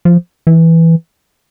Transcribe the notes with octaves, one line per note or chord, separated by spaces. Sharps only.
F3
E3